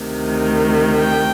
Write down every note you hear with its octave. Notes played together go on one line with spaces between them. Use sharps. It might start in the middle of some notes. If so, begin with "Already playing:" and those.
Already playing: D2 C3 D#3
G5